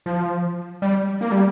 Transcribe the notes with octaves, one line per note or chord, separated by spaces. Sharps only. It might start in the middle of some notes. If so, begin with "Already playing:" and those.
F3
G3
A#3
G3